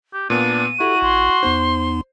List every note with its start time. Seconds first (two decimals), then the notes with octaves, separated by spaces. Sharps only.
0.14 G4
0.30 A#2 B3 D4 D#7
0.80 E4 F#4 G4 A4
1.02 A1 C6
1.43 E2 B3 D#4 C5